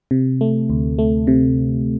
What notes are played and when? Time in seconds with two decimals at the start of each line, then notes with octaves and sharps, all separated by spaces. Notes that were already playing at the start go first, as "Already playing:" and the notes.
0.11 C3
0.41 A3
0.70 D2
0.99 A3
1.27 C3